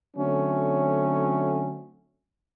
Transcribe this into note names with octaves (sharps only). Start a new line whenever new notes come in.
D3 F#3 A3 C4 C#4